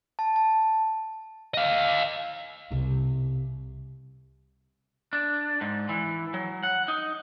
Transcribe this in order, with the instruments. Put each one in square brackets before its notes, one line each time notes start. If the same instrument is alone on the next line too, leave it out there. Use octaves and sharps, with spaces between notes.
[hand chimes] A5
A5
[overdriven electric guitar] D#5 F5
[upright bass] C2 B2
[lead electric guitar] D4
G#2
E3
F#3
F#5
D#4